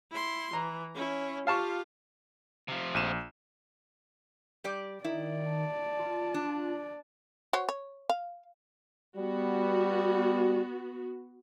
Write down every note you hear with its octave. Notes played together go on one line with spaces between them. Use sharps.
E4 C6
E3 A#5
C#4 E4
F4 G4 F5 A5 C#6
C3 F3
A#1 D#7 E7
G3 G4 D5
D#3 E4 D5
A5
F4
D4
F#4 C5 C#5
C#5
F5
G3 B3 F#4